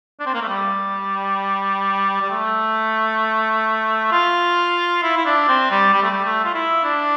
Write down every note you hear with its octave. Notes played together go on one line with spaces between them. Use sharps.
D4
C4
A#3
A3
G3
G3
A3
F4
E4
E4
D4
C4
G3
G3
A3
G3
A3
F4
E4
D4